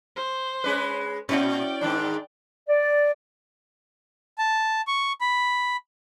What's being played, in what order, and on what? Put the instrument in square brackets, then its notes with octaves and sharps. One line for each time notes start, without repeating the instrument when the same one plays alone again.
[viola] C5
[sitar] G#3 C#4 B4
[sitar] A#2 [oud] C#4 E4 F#4 [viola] D5 G5
[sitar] G#2 D#3 D4
[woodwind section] D5
[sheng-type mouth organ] A5
C#6
B5